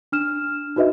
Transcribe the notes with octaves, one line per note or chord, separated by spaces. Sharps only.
D4 F6 E7
D#4 F#4 B4 D#5 E5